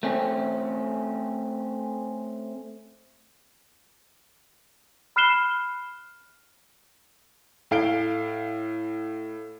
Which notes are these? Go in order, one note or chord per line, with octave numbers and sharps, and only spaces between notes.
A3 C4 C#4
B5 F6 F#6 C7 E7 G7
A2 F5 D7 G7